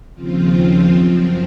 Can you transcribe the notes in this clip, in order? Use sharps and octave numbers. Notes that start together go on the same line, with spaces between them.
D#2 C#3 F3 C4 F4
F#2 F3 C4